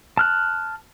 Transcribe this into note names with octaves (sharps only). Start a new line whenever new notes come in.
A5 F6 F#6